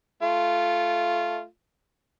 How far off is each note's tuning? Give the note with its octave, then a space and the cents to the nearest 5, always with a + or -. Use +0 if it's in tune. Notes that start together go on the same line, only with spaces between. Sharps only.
A3 -15 F4 -10